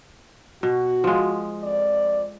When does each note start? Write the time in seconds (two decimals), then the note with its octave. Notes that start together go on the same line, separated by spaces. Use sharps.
0.63 B2 F#4
1.04 F3 G#3
1.62 F2 D5